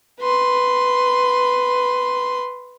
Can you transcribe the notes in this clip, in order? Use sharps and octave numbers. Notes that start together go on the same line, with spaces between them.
B4 C6